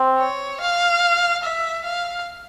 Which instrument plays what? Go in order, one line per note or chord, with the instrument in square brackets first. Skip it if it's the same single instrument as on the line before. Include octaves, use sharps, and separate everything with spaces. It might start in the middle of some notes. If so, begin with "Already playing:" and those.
Already playing: [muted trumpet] C4
[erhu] C#5
F5
E5
F5